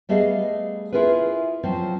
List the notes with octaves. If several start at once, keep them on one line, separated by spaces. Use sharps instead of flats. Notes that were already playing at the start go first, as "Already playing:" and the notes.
G3 A3 B3 G#4 D#5 F5
E4 F4 G#4 A#4 B4
F3 F#3 C4 F4